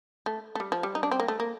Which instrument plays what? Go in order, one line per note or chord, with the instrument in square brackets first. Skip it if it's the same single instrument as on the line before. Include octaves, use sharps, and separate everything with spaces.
[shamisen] A3
A3
G3
F3
G3
D#4
D4
C4
A#3
A3
A#3